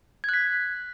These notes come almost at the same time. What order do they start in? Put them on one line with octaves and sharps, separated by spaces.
G#6 F#6 B6